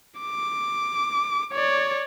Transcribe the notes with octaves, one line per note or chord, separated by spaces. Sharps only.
D6
C#5 D5